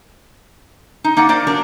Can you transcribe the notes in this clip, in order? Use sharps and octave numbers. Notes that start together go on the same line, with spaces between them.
D#4
A#3 D#4 D5 F#5
A#3 A#4 C5 D5
F#3 D4 A#4